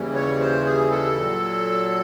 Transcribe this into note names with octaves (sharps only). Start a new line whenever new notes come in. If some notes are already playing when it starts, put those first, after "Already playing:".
Already playing: D#2 C#3 E3 G3
C#5
C5
G#4
A4
A#2 F#3